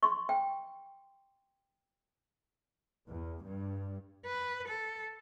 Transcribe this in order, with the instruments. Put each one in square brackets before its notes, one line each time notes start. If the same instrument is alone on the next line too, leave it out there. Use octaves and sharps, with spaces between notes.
[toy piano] C6 C#6
G5
[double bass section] E2
G2
[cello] B4
A4